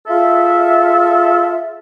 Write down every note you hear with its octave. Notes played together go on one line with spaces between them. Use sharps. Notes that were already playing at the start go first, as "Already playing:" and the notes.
F4 G#4 A4 E5